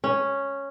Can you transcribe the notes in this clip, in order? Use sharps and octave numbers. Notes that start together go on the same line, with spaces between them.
C#4